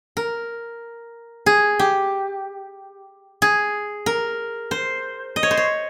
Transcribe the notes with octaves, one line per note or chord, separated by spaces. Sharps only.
A#4
G#4
G4
G#4
A#4
C5
D#5
C#5
C5
C#5